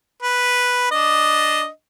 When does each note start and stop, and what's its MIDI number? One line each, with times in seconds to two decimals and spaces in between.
0.22 0.90 71
0.91 1.68 62
0.91 1.68 75